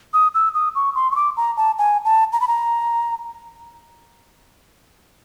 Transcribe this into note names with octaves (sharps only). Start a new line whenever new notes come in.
D#6
E6
D#6
C#6
C6
C#6
D6
A#5
A5
G#5
A5
A#5
B5
A#5